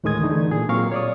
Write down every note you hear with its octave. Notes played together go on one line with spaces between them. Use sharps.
D2 A2 D#3 G#3 D#6 G#6
D3 E3 A3 D#4
A#2 G#4
A#2 F#3 C4 A#4 F5 C#6
C#5 D5 D#6